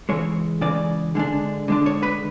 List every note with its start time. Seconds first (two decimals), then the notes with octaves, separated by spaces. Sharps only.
0.09 C#3 E3 G#3 C#5
0.61 C#3 E3 G#3 D5
1.15 D3 G#3 D4
1.68 D3 G#3 D4
1.86 C#5
2.03 B4